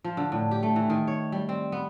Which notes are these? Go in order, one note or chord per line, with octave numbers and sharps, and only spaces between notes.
F3
D3
A2
G4
A3
E3
D#3
C#5
G3
C4
B3